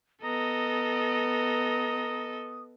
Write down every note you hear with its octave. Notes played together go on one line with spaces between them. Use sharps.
B3 A4 D#5 A#5 D#6